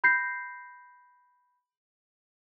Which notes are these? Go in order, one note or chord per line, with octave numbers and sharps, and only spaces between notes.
B5 G6 A#6 C7